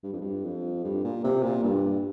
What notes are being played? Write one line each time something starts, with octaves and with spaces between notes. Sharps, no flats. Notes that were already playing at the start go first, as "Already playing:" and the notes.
G2
F2
G2
F2
G2
A#2
C3
A#2
G2